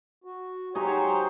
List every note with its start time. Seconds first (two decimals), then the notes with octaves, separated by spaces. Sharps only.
0.24 F#4
0.75 F#3 D#4 G4 G#4 C5 C#5